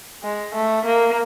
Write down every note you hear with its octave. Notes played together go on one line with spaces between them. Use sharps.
G#3
A3
A#3